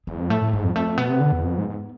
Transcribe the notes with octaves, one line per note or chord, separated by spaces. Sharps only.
E2 G#3
F2
A2 A3
A2
G#2 G#3
F2
F2 A3
F2
B2 B3
C3
D3
E2
F2
G#2
G#2